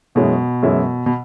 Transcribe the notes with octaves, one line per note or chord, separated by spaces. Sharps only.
F#2 B2 E3 G#3 C#4 E4
F#2 E3 G#3 C#4 E4
B2